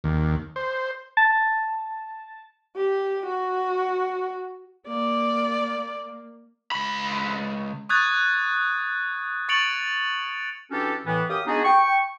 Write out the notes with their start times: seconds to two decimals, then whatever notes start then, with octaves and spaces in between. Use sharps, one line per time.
0.04 D#2
0.56 C5
1.17 A5
2.76 G4
3.26 F#4
4.88 A#3 D5
6.72 C#2 B5
7.89 C#6 D#6 F#6 G#6 A6
9.49 C#6 A6 C#7 D7 F7 F#7
10.71 E3 C#4 D4 F#4 G4 A4
11.05 A2 E3 B3
11.29 F#2 G4 F5 D#6
11.47 G#3 B3 D4 D#4 F#4 G#4
11.65 G5 C#6